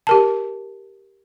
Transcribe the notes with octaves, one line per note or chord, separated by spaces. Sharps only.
G4 A#4 A5